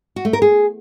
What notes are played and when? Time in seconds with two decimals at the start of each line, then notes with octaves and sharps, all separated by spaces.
0.16 F#4
0.25 A3
0.33 A#4
0.42 G#4